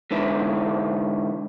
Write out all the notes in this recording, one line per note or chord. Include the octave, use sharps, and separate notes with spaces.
G#2 D3 E3 E4